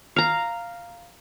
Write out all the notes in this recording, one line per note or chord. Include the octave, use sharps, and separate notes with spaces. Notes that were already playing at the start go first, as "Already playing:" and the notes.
F5 A#5